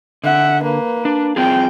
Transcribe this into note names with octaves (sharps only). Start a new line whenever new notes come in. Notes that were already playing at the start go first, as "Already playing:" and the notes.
D3 E5 F#5
A#3 B4
D4
C4 F4 G#4 G5